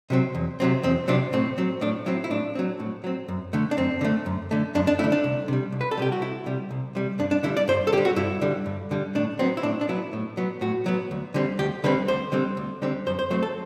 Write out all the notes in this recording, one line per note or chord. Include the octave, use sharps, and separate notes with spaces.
C3 F#3 C4
E2
C3 F#3 C4
E2 C4
C3 F#3 C4 D4
A2 C4
F#3 C4
A2 D4
F#3 C4 E4
E4
A2 D4
F#3 C4
A2
F#3 C4
F#2
D3 A3
D4
F#2 C4
D3 A3
F#2
D3 A3
F#2 D4
D4
D3 A3 E4
D4
C2
C3 G3
C2
B4
A4
C3 G3 G4
F#4
C2 E4
C3 G3
C2
C3 G3
G2 D4
D4
D3 G3 E4
D5
G2 C5
A4
D3 G4
G3
F#4
G2 E4
D3 G3
G2
D3 G3
A2 D4
F#3 B3 C4
E4
A2 D4
D4
F#3 B3 E4
A2
F#3 B3
A2 F#4
F#3 B3
D2
D3 G3 C4
D2 G4
D3 G3 C4 B4
D2 C5
D3 G3 C4
D2
D3 G3 C4
F#2 C5
C5
F#3 A3 C4 C5
A4